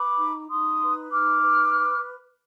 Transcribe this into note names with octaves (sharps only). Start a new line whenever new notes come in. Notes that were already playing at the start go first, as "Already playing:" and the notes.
Already playing: B4 B5 D6
D#4
D#4 C6 D#6
B4
D#4 D6 F6
B4